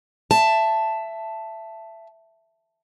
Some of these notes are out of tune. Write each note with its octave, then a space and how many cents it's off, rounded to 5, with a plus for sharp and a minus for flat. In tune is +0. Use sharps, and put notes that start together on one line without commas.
E5 +15 A5 +0